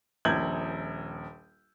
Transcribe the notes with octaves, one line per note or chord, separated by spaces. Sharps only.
D#1 A#1 G6 G#6 F#7